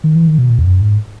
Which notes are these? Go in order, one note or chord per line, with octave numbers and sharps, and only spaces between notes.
D#3
E3
D#3
B2
A#2
E2
F#2
G#2